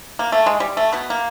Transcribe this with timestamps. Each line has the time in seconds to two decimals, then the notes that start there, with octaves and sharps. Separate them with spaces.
0.19 A#3
0.32 A3
0.46 G#3
0.60 G3
0.77 A3
0.93 B2 B3
1.10 A#3